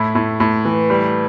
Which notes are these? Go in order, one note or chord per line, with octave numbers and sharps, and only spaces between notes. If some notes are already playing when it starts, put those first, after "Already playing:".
Already playing: A2 E4
A2
A2
E3
G3